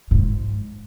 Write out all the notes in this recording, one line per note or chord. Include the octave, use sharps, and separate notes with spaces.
G#2